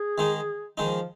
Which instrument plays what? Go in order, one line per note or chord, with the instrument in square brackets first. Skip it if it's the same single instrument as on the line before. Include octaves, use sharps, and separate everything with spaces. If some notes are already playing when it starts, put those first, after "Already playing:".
Already playing: [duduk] G#4
[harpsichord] D#3 G#3 D#4
[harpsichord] D#3 G#3 D#4 [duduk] F3